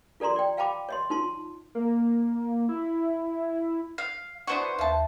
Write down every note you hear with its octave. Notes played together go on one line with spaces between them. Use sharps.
F4 A4 D5 A#5 C6
D5 G5
F5 G5 A5 B5 D6
C#5 D#5 C6
D#4 F4 A5 C6
A#3
E4
F5
B3 D4 E4 F#4 C5 C#6
D#2 E5 F5 A5